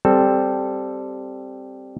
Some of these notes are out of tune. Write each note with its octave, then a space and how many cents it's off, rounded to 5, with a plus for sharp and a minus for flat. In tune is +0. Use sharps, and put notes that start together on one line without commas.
G3 +0 C4 +0 A4 -5